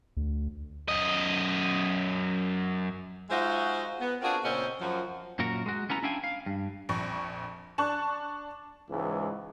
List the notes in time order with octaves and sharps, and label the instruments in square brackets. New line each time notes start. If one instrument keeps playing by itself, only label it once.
[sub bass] D2
[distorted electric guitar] F#2 D#5
[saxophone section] G#3 D#4 F4 F#4 C5 E5
B3
C4 D4 F4 F#4 G#4 A#4
A#2 C#3 C4 C#4 C5 D#5
F#2 F3 F#4
[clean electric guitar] F#2 A#2 F#4 A#4
G#3 F#4
B3 C#4 E4 A#5
C#4 D4 E4 F5 G5 G#5
F5
G2
[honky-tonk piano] A#1 F2 C#6
D4 A5 C#6 F#6
[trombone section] C#2 G#2 E3 G#3